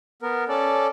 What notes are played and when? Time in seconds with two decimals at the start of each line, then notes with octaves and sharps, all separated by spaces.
0.22 B3 A#4
0.49 C#4 A4 D5